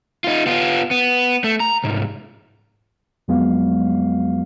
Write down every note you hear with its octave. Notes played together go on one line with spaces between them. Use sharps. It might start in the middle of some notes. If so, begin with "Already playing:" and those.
D#4 F4
B3 F4
B3
A3
A#5
C2 G#2
F2 F#3 G#3 B3 F5